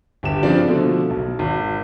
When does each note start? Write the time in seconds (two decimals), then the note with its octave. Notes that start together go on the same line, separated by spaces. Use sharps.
0.23 G1 G4 E7
0.43 C#3 F3 C4 D4 D5
0.68 B2 D3 F3 A3
1.10 B1
1.39 G#1